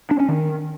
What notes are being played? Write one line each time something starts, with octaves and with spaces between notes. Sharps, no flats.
D4
C#4
D#3